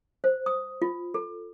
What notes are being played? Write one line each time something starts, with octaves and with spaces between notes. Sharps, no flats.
C5
D#6
F4
A4